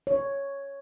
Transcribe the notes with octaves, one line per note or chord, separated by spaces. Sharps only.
C#5